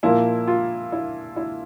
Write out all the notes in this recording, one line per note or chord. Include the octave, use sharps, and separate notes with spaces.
A#2 F3 A#3 E4
F4
E4
E4